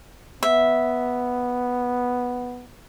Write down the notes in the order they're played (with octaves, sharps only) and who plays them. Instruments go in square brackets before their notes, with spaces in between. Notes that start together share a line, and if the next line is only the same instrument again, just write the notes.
[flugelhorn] B3 [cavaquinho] E5